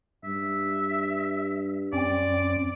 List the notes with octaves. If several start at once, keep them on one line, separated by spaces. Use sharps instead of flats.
G2 E5
F#2 C4 C#4 D5